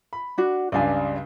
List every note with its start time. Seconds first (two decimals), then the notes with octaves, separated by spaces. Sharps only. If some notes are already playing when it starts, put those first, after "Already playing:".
0.13 B5
0.38 D4 F#4
0.72 C#2 G2 C#3 D5 F5 G#5